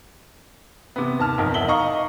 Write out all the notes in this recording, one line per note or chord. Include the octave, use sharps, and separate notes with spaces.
C3 B3
D#2 A5 F6
B1 F2 A#4
E1 E2 E5 F#7 G7
D#4 D#5 F5 A#5 C#6